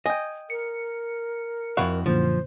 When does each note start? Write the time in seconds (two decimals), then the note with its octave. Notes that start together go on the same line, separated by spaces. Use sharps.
0.06 D#5 G5 G#5
0.50 A#4 C#7
1.77 F2 C3 E4 F#4 F5
2.06 F#2 A#2 D3 F3 C5